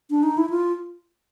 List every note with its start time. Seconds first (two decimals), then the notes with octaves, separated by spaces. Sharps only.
0.10 D4
0.23 D#4
0.37 E4
0.50 F4